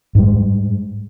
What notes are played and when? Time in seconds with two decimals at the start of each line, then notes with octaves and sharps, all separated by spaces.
0.15 G#2
0.19 G3
0.23 G#3